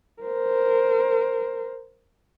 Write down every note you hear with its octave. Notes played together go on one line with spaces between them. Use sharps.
A#4 C5